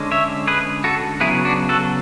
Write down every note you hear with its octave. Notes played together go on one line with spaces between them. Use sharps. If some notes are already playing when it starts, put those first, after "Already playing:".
Already playing: D3 G#3 C#4
C#5 E5
G#4 B4
F#4 A4
C#3 F#3 B3 E4 G#4
D4 F#4
F#4 A4